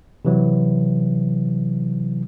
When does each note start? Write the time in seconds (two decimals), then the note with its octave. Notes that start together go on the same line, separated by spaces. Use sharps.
0.25 C3 E3 F#3